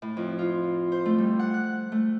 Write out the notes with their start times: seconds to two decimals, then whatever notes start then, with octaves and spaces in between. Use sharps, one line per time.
0.02 A2
0.17 F2
0.39 F4
0.92 C5
1.06 A3
1.18 G3
1.39 F#5
1.54 F#6
1.92 A3